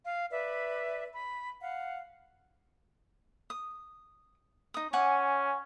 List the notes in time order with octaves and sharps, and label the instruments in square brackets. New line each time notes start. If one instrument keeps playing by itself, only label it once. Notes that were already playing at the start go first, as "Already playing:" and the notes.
[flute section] F5
B4 D5 E5
B5
F5 F#5
[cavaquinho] D#6
D#4 D#6
[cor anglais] C#4 [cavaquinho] F#5 G#5 D6